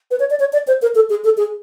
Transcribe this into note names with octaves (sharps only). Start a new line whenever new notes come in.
B4
C#5
D5
C#5
D5
C5
A#4
A4
G#4
A4
G#4